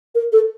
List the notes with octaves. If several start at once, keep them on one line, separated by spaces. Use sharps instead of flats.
A#4
A4